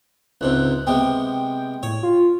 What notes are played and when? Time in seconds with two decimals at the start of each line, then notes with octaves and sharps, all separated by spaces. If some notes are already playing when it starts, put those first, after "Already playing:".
0.41 C#2 G#2 C3 F#6
0.87 C3 G#3 B3 G5
1.83 A2 C#5
2.03 F4